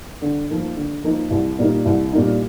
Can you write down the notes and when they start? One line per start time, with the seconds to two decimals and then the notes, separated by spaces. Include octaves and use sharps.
0.22 D3
0.49 F3 A#3 D#4
0.76 D3
1.04 F3 A#3 D#4
1.30 C2
1.59 A#2 G3 A#3 D#4
1.85 C2
2.13 A#2 G3 A#3 D#4